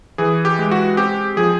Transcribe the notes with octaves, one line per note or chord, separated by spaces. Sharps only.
E3 G#4
G4
G#3
F#4
C4 G4
F3 G#4